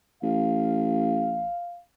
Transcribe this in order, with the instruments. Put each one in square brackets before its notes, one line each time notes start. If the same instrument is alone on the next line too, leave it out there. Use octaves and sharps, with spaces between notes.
[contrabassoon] A1 [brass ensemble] F5